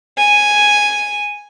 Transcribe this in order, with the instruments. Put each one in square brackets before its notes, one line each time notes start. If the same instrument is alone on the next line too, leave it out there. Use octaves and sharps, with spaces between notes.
[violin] G#5